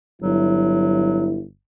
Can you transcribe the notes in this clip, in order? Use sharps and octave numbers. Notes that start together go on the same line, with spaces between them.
G1 F#3 E4